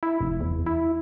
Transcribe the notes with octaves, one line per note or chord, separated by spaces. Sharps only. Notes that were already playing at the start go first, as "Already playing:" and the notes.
E4
F1
E2
E4